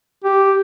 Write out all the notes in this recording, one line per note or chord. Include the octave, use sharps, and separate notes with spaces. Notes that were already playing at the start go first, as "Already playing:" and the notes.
G4